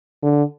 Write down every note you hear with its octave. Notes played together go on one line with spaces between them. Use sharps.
D3